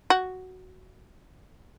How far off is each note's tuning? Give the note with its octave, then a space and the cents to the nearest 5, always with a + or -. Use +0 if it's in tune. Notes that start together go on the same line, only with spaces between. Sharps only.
F#4 +5